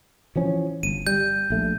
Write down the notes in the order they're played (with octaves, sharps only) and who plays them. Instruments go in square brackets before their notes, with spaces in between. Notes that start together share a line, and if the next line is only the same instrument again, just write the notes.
[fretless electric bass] E3 F3 C#4
[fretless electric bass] G1 [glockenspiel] D#7
[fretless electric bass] G3 [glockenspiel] G6
[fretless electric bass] A#1 A3